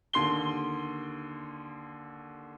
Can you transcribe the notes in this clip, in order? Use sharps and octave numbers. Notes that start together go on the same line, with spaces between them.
D#2 D3 C6 C7 G7